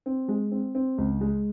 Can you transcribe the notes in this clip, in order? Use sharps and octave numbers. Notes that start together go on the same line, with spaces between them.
C4
G#3
C4
C4
C#2
G#3